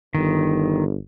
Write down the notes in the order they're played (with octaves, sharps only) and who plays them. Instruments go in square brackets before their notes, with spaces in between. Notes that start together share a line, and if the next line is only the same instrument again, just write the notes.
[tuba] G1 [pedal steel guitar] D#3